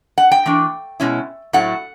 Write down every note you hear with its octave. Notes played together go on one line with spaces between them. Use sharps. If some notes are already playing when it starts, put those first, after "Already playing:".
F#5
G5
E3 A3 D4
B2 G#3 C#4 E4
A2 F#3 A3 F#5